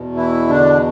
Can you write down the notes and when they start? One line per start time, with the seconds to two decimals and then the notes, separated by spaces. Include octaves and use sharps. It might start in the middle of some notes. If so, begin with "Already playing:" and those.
Already playing: E2 B2
0.16 E3 E4
0.49 D3 D4